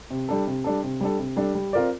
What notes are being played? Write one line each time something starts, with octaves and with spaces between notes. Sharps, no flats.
C3
G3 D4 A4
C3
G3 D4 A4
C3
G3 D4 A4
C3
G3 D4 A4
G3
C4 F4 A#4 D5